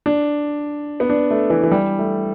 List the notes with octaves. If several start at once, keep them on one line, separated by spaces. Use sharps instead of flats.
D4
B3
D4
A3
E3
E3
G3
A3